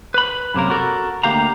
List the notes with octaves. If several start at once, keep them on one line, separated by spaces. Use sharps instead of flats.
B4 B5
F#2 C3 A#3 A#4
F#4 A4 A#4
D2 D#3 A#3 G4 F5 A#5